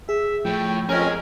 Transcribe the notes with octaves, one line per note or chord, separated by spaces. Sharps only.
G#4 E5
A2 F3 G5
F2 C#4 G#4 A#4 D#5 A#5